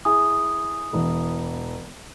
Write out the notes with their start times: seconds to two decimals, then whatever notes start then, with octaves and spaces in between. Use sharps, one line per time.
0.05 E4 G#4 G#5 D#6
0.93 E1 E3